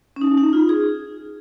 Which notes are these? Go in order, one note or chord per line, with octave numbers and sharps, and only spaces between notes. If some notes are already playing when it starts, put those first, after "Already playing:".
C#4
D#4
D#4
F4
G#4